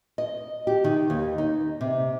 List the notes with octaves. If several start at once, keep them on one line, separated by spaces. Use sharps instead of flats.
D#5
G4
D#3
D#2
D#4
C3